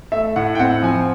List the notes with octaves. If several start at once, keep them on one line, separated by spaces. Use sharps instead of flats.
A3 E5
A2 F#5
G5
C4 F#5
F3 G#5